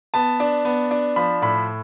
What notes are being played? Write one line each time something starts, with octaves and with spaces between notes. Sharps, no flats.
B3 A5
D4
B3
D4
F3 B5
A2 B5